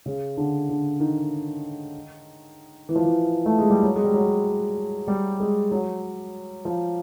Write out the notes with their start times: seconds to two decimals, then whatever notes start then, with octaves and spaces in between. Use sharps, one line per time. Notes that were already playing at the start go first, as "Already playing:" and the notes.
0.06 C#3
0.37 D3
0.69 D3
1.00 D#3
2.89 E3
2.96 F3
3.04 E3
3.46 A3
3.58 G#3
3.70 G3
3.83 F#3
3.96 G#3
4.04 G3
4.14 F#3
5.08 G3
5.40 G#3
5.72 F#3
6.65 F3